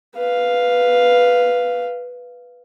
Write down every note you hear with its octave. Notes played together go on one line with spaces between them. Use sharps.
B4 F5